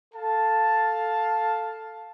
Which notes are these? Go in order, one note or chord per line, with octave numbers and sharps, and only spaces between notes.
A4 F5 A5